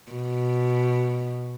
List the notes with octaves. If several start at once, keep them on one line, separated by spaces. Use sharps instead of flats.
B2